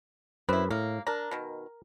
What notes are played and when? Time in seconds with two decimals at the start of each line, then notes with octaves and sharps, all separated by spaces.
0.49 F#2 C4 E4 B4
0.71 A2 A#3
1.07 D4 A#4 A#5
1.31 B2 D#3